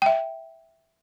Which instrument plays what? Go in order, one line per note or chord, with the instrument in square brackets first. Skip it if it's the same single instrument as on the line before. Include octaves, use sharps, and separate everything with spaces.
[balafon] E5 G5